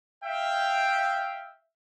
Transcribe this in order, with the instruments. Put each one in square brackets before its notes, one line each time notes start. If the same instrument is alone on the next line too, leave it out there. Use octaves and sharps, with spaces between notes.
[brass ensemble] E5 F5 G5